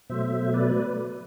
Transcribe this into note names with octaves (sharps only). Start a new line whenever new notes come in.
B2 F#3 A3 C5 E5
B4 D5